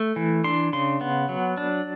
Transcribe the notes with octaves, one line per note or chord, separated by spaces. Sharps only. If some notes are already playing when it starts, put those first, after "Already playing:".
Already playing: A3
E3
D4 C6
C#3 C6
B3
F#3
D4